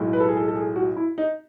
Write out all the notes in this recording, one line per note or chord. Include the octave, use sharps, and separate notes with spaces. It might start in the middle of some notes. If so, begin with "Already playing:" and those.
Already playing: B1 A2 G#3
B4
A4
G#4
A4
A4
G#4
F#4
E4
D#4